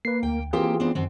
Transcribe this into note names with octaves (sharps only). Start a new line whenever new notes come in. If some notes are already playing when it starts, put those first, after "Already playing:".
A#3 B4 C7
D2 G5
E3 A#3 C4 F4 G4 G#4 G5
B3 C4 D4
F#2 D#3 C4